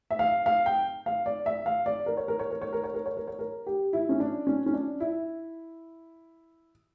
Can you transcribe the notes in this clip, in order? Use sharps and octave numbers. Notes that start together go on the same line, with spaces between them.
E5
F5
F5
G5
F5
D5
E5
F5
D5
A#4
C#5
A#4
C#5
A#4
C#5
A#4
C#5
A#4
C#5
A#4
C#5
A#4
G4
E4
C#4
D4
C#4
C#4
D4
E4